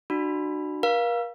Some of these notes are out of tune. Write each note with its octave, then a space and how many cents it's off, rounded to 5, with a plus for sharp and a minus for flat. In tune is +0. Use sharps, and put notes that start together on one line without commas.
D4 +35 F#4 +0 B5 +0
A#4 +40 F5 +0